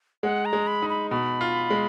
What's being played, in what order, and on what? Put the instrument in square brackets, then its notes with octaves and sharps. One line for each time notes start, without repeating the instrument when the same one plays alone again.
[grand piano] G#3 [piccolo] F#5
[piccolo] A#5
[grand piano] G#3
[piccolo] B5
[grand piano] D#4
[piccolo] B5
[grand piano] B2 [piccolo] B5
[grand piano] F4
G#3